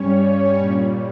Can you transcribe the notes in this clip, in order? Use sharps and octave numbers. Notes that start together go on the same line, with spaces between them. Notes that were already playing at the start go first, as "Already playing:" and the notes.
Already playing: G2 G3 C#4 C#5
C#4 C#5
A#2 G3